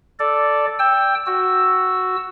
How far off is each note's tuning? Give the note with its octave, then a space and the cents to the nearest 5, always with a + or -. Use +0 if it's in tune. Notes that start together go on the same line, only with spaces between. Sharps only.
A4 +0 D5 -5
G5 +10 E6 +0
F#4 +0 E6 +0